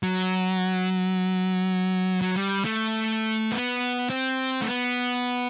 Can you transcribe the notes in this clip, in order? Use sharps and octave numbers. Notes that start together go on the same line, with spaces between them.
F#3
F#3
G3
A3
B3
C4
A3
B3